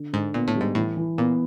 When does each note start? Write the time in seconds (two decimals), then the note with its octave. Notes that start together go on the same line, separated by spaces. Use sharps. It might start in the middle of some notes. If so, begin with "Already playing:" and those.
Already playing: D3
0.13 G#2 D3
0.34 A#2 B3
0.48 A2
0.55 G3
0.61 G#2
0.75 A2 E3
0.97 E3
1.18 A#2 B3